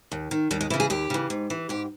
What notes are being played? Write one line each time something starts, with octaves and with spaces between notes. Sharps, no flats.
D#2
D#3
D#2 G3
G#3
C#3 E3 E4
G#4
D#2 G4
C#3 E3
G#2
E3
G#2 G4